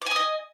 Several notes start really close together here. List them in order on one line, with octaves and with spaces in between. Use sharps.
D6 G#5 D#6 D#5